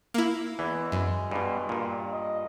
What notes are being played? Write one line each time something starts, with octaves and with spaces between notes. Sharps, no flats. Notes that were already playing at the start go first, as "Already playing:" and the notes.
A#3 E4
E2 E3 G#3
F#2
G2 B2
G2 A#2
D#5